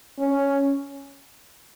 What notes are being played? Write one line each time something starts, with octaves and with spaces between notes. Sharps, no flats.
C#4